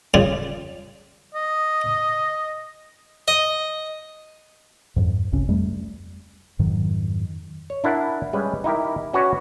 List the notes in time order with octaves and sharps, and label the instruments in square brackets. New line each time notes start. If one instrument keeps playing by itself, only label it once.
[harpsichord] C#3 G3 F4
[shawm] D#5
[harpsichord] D#5
[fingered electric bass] F2 G#2
G#1 C#2 C3 C#4
F2 G3 A3
F2 G#2 D#3 F#3
[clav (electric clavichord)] C#5
D4 E4 A#4 F#5
G3 G#3 C#4 B4
D#4 E4 G4 A#4
C#4 F#4 B4 C#5 D5